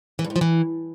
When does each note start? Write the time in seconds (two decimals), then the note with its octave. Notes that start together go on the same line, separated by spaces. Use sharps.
0.19 E3
0.25 G2
0.30 G#2
0.36 F3
0.41 E3